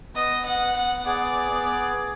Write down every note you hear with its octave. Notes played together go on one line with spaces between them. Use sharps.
B3 D#5
F#5
B3
F#5
G#4 D5
B3